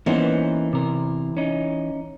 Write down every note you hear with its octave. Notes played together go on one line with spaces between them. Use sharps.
E3 A#3 B3 C#4 D#4 C5
C3 A#4
C#4 D#4